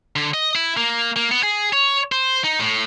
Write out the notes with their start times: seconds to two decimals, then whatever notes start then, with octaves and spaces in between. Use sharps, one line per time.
0.16 D3
0.34 D#5
0.55 E4
0.77 A#3
1.16 A#3
1.31 B3
1.43 G#4
1.73 C#5
2.12 C5
2.44 D#4
2.59 A2